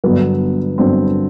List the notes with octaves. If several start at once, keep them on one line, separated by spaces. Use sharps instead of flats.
G1 G2 F#3 B3
G1 G2 F#3 C4